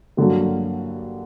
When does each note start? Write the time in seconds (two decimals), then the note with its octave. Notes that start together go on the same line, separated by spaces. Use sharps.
0.17 G2 D3 F#3 A#3